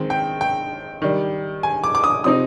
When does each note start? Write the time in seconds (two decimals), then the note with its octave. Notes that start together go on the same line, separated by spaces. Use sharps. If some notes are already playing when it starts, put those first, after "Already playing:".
Already playing: D#3 G#3 C4
0.10 G5
0.41 G5
1.02 D#3 G3 D4
1.63 G#5
1.84 D6
1.95 D6
2.04 D#6
2.24 C3 F3 C4 D#4 D#6